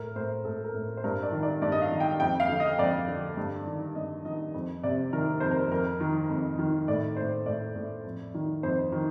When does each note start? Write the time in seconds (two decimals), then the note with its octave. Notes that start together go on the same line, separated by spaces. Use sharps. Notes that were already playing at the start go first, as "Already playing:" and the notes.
Already playing: A2 A#4
0.16 A2 C5
0.45 A2 A4
0.64 A#4
0.74 A2
0.97 C5
1.04 G2 A#4
1.23 D5
1.32 D#3
1.43 D5
1.62 G2 D5
1.72 D#5
1.82 F5
1.91 D#3
2.00 G5
2.20 F2 G5
2.40 F5
2.49 D3
2.60 D#5
2.78 F2 D5
3.08 D3
3.37 G2
3.67 D#3
3.95 G2 D#5
4.25 D#3 D#5
4.54 F2
4.83 C3 D5
5.13 D#3 A#4
5.40 F2 C5
5.51 A#4
5.71 F2 A#4
6.00 D#3
6.29 F2
6.59 D#3
6.88 A2 D5
7.17 A2 C5
7.46 A2 D5
7.76 A2
8.05 F2
8.35 D#3
8.63 F2 C5
8.92 D#3